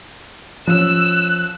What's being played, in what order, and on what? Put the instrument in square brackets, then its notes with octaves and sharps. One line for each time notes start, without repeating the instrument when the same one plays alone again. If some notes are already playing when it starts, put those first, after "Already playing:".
[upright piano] F3 C#4 [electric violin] E6 [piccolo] F#6